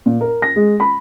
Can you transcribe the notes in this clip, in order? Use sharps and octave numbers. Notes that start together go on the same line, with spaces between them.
A#2
A#4
A#6
G#3
B5